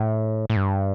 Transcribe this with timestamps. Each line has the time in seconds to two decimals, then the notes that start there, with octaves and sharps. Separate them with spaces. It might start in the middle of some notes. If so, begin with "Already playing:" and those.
Already playing: A2
0.50 A2
0.56 G2